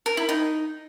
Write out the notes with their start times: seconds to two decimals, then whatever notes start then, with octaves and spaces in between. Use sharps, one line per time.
0.06 A#4
0.17 E4
0.29 D#4